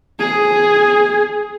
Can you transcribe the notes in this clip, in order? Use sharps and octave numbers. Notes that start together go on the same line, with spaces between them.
G#4